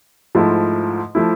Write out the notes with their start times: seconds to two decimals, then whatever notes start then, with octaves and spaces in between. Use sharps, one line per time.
0.35 G#2 F3 A3 E4
1.15 F3 A3 E4